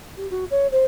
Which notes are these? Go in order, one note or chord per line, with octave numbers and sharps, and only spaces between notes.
G4
F#4
C#5
C5